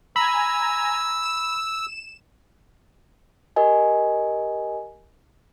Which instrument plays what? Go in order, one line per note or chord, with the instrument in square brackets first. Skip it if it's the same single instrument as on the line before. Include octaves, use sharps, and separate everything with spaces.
[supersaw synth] G#5 A#5 [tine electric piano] B5 [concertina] E6
[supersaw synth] E7
[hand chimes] G4 A#4 D#5 G#5